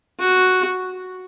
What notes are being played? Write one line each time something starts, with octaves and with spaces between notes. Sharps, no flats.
F#4